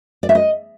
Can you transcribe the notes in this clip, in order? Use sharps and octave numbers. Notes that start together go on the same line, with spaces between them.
D5
E5
D#5